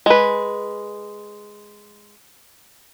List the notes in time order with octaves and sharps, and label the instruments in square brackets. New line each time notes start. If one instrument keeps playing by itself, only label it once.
[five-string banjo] G#3 B4